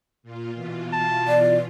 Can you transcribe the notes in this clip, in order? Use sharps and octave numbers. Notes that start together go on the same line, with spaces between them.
A#2 F4
B2 E3 F4
A5
D5